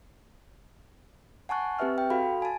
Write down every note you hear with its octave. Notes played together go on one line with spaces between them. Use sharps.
F#5 G#5 A5 C#6 F#6
C4 G4 B4 E5 F6
G5
F#4 A4 F5 B5
G#5 A5